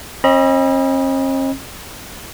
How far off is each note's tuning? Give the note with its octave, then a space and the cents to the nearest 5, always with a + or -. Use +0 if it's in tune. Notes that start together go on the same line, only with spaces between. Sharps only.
C4 +45 D#5 +0 B5 -35